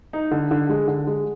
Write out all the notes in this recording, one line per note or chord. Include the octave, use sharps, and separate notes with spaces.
D#4
D3
D3
G#3
D3
G#3